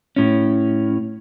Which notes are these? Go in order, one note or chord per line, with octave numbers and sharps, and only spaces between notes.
A2 C#4